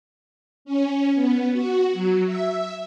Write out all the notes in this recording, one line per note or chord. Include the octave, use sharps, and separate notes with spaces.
C#4
B3
F#4
F#3
E5